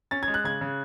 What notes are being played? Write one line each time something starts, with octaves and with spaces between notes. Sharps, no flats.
C#4 A6
G#6
G#3
F#6
C#3 G#6
C#3